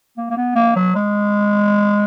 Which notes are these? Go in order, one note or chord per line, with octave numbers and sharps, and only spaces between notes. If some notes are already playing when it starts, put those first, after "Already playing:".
A#3
A#3
B3
A#3
F#3
G#3